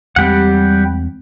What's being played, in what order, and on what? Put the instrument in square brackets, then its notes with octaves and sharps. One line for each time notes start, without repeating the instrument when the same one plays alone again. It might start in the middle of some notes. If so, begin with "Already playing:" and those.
[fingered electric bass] E2 G#3 C4 [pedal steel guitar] G3 G4 F#5